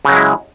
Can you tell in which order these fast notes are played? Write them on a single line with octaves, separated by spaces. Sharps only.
C#3 F#3 G#3 E4